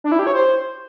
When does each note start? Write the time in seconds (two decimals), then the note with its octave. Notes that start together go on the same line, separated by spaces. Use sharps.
0.04 D4
0.12 E4
0.19 G4
0.27 C#5
0.34 C5